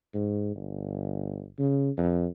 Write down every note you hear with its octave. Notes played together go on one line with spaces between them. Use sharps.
G#2
G1
C#3
F2